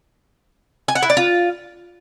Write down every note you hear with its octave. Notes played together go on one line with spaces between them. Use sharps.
G#5
F#5
E4
D5
F4